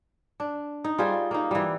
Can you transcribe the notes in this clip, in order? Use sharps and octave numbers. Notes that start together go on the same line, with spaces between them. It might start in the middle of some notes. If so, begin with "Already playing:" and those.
D4
D#4
G3 F4 G#4 C5
A#3 D#4
E3 G3